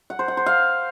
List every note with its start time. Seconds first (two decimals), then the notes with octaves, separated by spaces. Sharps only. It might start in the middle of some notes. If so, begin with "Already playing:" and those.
0.10 F#5
0.19 C5
0.28 F#5
0.37 C5
0.46 F5